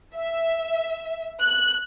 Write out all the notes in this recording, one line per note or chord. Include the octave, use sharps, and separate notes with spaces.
E5
F#6